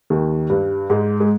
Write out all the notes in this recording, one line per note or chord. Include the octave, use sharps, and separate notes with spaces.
D#2 D#3
G2 G3
G#2 G#3
G#3